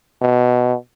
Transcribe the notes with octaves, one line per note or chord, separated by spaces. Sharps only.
B2